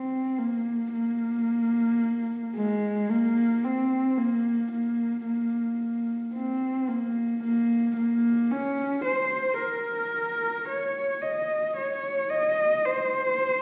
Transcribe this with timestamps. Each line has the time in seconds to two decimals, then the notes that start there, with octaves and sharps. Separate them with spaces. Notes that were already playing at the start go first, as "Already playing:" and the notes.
Already playing: C4
0.38 A#3
0.93 A#3
2.56 G#3
3.09 A#3
3.64 C4
4.18 A#3
4.71 A#3
5.26 A#3
6.34 C4
6.88 A#3
7.44 A#3
7.97 A#3
8.51 C#4
9.05 C5
9.60 A#4
10.69 C#5
11.22 D#5
11.77 C#5
12.30 D#5
12.85 C5